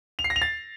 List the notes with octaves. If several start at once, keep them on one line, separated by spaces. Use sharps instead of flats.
F7
C7
A#6
F7
A6